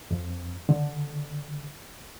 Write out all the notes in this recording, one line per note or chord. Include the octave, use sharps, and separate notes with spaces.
F2
D3